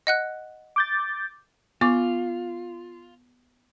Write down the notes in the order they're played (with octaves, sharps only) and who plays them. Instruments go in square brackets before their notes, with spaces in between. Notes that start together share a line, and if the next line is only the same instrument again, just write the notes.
[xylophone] D#5 F#5 F#6
[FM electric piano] D6 G6 A6
[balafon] B3 C#6 D6 [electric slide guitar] F4